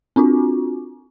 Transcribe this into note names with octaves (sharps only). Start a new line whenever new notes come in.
C4 D4 F4 F#4